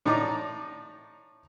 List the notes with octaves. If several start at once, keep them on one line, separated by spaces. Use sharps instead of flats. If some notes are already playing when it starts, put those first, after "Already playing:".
A2 D#4 D5 A#5 D6